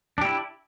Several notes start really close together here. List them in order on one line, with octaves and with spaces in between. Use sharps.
D4 G4 E4